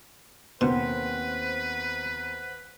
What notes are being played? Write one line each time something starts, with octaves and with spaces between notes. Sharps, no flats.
D#2 B2 B3 C4 B4 C5 F#5